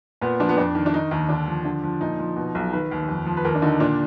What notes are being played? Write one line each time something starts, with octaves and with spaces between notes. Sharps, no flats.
A#2 B3
F3 D4
B3
F2 D4
D#3
D4
D#3 D#4
D#2 D#4
D3 D4
F3
D3
F3
A#2 D#4
F3
B2
B1
D#3 B4
D#2
F2
F3
B4
D#2 A#4
D4
D3 D#4
A#2 D4